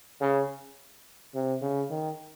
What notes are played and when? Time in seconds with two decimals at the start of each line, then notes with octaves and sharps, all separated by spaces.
0.21 C#3
1.34 C3
1.62 C#3
1.90 D#3